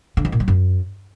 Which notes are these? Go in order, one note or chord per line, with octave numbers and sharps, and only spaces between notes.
D3
F2
A#2
F#3
F#2